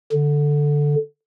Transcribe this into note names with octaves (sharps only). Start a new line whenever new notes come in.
D3